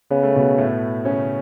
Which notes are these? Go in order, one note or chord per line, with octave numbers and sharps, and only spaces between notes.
C#3 B3
A3
B2 B3
A2 A3
C#3 C#4